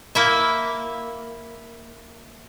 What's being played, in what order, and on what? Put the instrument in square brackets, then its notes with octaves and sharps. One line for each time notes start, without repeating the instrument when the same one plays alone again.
[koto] A#3 E4 E5